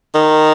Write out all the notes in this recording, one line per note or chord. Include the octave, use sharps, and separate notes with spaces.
D#3